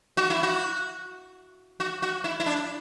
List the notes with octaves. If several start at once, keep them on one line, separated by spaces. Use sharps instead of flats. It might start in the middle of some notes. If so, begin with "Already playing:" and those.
F#4
E4
F#4
F#4
F#4
E4
E4
D4